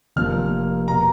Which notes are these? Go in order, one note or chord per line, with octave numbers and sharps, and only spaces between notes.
F1 F2 F3 A#3 F6
B2 A#3 A#5